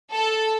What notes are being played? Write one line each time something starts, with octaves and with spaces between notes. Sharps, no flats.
A4